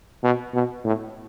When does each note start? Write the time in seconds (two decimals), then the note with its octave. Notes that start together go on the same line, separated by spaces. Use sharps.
0.23 B2
0.53 B2
0.84 A2